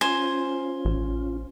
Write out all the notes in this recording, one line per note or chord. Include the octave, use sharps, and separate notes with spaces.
C#4 F4 C5 G#5
A1